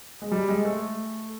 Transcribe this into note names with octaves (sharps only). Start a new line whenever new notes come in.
G#3
G3
G#3
A3